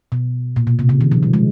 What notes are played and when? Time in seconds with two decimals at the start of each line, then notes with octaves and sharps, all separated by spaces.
0.12 B2
0.56 A#2
0.67 B2
0.79 C3
0.89 C#3
1.01 D#3
1.12 F3
1.23 G3
1.33 G#3